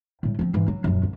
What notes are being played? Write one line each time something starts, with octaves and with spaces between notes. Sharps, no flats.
A2 G3
F3 C4
G#2 E3
F#3
D#1 F#2
C2